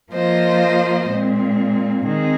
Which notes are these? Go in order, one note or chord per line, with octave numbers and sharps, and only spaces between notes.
F3 A#3 F4 C5 D#5
A#2 G#3 C4
D#3 C4 G#4